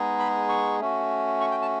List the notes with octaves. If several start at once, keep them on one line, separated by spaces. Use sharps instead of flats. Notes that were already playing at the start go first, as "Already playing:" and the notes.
Already playing: G#3 B3 D#4 G#4
B5
C#6
A3 C#4 F#4
C#6
G5
A5